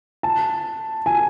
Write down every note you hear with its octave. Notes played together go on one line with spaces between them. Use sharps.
A5
G#5